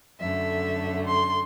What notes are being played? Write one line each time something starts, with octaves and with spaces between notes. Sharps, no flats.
F#2 D3 A3 E5
C6